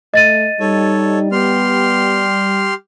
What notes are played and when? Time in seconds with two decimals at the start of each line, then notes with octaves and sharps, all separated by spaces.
0.14 A3 D#5 A6 D#7
0.60 G3 D#4 A4 C#5
1.32 B3 G4 C6 F6